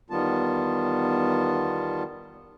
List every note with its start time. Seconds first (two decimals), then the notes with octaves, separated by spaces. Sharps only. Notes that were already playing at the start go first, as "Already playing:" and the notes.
0.10 E2 D#3 G3 B3 F4 A5